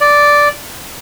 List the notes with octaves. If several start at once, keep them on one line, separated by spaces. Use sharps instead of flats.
D5